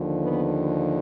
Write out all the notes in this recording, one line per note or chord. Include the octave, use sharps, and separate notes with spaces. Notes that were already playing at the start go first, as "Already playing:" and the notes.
Already playing: D#2 D3 F3
B3